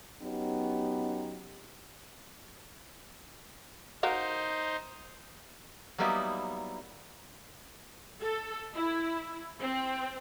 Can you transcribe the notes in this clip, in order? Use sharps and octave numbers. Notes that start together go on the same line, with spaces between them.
F#3 B3 C#4 D#4 G4
D#4 F#4 A#4 C5 F5
F#3 G3 A#3 B3 D#4 E4
A4
E4
C4